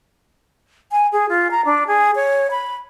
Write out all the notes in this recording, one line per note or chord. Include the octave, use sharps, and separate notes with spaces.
G#5
G#4
F4
A#5
D4
G#4
C#5
B5